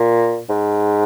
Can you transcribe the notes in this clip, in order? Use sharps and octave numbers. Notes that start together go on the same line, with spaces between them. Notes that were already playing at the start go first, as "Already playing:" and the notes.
Already playing: A#2
G#2